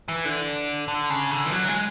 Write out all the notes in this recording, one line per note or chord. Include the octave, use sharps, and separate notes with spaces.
E3
D3
D3
C#3
D3
E3
F#3
G#3